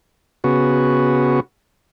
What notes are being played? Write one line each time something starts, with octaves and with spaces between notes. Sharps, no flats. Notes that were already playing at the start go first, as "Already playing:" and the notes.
C#3 B3 F#4